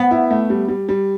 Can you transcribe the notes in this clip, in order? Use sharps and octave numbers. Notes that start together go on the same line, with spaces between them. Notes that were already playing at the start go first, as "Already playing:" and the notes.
Already playing: B3
E4
A3
G3
G3
G3